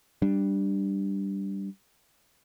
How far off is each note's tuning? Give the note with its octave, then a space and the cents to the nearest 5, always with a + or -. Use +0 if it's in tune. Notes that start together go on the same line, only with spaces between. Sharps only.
G3 +0 D4 +0